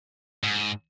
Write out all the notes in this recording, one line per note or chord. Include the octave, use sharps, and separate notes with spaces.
G#2